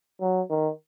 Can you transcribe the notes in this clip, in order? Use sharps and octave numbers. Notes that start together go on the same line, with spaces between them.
F#3
D#3